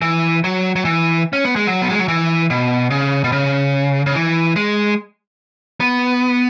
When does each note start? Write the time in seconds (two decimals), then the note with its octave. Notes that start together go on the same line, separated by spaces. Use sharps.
0.02 E3
0.44 F#3
0.76 F#3
0.85 E3
1.33 C#4
1.45 B3
1.56 G#3
1.67 F#3
1.82 B3
1.90 G#3
1.99 F#3
2.08 E3
2.50 B2
2.90 C#3
3.24 B2
3.32 C#3
4.06 C#3
4.15 E3
4.56 G#3
5.80 B3